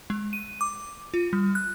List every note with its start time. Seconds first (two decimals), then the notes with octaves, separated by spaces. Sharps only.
0.10 G#3
0.33 D#7
0.61 D6
1.14 F4
1.33 G3
1.55 F#6